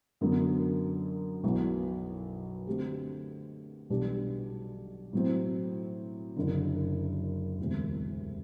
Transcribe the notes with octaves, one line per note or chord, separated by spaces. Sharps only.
F#2 D3 F#3 B3
B1 B2 F#3 B3 E4
D3 A3 C4 G4
B1 B2 G3 D4 G4
A2 F#3 C4
F#1 F#2 D3
E1 D2 C3